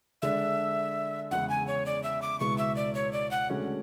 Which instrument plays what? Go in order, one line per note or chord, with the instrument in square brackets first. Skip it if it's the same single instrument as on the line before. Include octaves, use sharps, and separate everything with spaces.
[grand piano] D3 G#3 D4 [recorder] E5
[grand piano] E2 C#3 G#3 [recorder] F#5
[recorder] G#5
C#5
D5
E5
D6
[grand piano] C#2 B2 G#3 B3 E4 [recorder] C#6
[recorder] E5
D5
C#5
D5
F#5
[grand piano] D2 D3 G#3 C#4 F#4